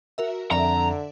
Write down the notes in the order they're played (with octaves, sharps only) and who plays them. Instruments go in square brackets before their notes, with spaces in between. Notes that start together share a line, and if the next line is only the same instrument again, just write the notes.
[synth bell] F#4 A#4 E5
[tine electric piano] F2 [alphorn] D3 [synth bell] D5 E5 [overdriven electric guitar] A#5